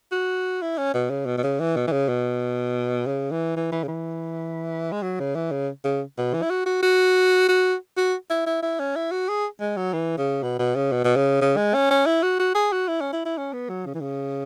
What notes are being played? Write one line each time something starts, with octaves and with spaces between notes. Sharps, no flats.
F#4
E4
C#4
B2
C#3
B2
B2
C#3
E3
B2
E3
C#3
B2
C#3
E3
E3
E3
C#3
E3
G#3
F#3
C#3
E3
C#3
C#3
B2
E3
E4
F#4
F#4
F#4
F#4
F#4
E4
E4
E4
C#4
E4
F#4
G#4
G#3
F#3
E3
C#3
B2
B2
C#3
B2
B2
C#3
C#3
G#3
C#4
C#4
E4
F#4
F#4
G#4
F#4
E4
C#4
E4
E4
C#4
B3
F#3
C#3
E3
C#3